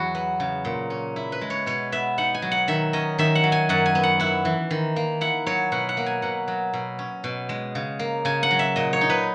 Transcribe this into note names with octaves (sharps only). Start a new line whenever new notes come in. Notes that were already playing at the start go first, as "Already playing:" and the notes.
Already playing: E2 F#3 F#4
B3
C#3
A#2
C#4
E4
B4
G#3
C#5
B2 C#5
B3 E5
D#4 F#5
G#5
F#3
F#5
D#3 E5
C#4 D#5
D#3 E5
F#5
F#3
G#5
F#2 F#5
G#5
B3
F#5
E4 F#5
E3
D#3
A#3
E4 F#5
F#3 C#5
B2 F#5
F#5
A#3
G#5
B2 F#5
F#3
B2
C#4
B2
G#3
C#3
A#3
C#3 G#5
F#5
F#3
E5
A#2 D#5
C#5
D#4
B4